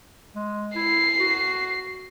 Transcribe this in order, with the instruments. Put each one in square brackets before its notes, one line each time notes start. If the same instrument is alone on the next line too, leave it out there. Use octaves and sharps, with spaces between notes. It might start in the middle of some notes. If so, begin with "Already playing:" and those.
[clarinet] G#3
[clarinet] E4 [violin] C7
[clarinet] F#4